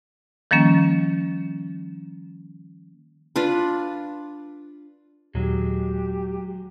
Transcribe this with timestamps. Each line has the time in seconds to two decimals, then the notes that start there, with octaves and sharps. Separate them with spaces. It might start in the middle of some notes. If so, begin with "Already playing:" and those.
0.51 D#3 F3 G3 A#3 C#4
3.36 D4 F4 B4
5.35 D#1 F#3 G#3 G4